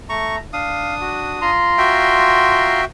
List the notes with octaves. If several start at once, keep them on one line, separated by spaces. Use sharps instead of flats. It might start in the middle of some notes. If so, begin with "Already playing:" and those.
A3 A#5 C#6
D4 F5 D#6
F#4
F4 A#5 C6
F#4 E5 G5